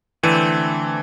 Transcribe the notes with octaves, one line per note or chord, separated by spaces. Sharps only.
D3 E3 A3 C4